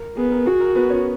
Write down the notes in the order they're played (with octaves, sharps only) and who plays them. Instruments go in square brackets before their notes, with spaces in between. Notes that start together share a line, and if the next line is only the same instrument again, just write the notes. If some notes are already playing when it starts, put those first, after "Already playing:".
Already playing: [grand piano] A#4
[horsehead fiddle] B3 [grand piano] G#4
[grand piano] A#4
[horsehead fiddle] F#4 [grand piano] G#4
[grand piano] A#4
B3 B4
C#4 C#5